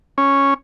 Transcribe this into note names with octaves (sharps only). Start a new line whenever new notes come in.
C#4